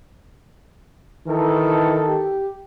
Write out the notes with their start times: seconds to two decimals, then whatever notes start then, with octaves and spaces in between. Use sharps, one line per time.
1.27 D#3 E3 A4
2.08 G4